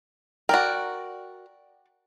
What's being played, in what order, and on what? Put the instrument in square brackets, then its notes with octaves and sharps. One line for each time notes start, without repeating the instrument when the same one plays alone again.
[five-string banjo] F#4 A#4 [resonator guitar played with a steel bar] D5 G5